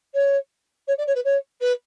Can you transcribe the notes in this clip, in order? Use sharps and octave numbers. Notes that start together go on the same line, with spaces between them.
C#5
C#5
D5
C#5
B4
C#5
B4